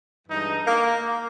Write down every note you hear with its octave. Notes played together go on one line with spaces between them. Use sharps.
G2 E3 G#3 D#4
A#3